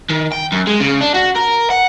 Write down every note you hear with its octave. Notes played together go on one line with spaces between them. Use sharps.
D#3
G5
F#2
G#3
C#3
D4
F#4
A#4
F#5